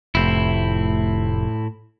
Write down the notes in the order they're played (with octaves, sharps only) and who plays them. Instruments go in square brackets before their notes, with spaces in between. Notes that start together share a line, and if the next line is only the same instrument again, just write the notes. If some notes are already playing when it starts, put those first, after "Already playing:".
[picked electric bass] F1 [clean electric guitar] A2 C4 E4